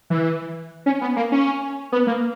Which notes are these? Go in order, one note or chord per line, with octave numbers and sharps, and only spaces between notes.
E3
C#4
B3
A#3
C#4
B3
A#3